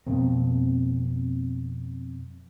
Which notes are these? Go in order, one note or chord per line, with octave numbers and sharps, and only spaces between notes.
F2 B2 A#3 C4